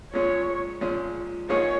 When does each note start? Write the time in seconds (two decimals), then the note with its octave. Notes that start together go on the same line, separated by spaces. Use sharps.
0.13 A#2 F3 G#3 C#4 C#5
0.81 A#2 F3 G#3 C#4
1.49 G#2 F3 A#3 D#4 G#4 C#5